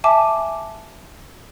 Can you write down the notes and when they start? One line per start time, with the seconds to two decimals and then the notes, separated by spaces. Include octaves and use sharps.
0.04 E5 G#5 A5 D6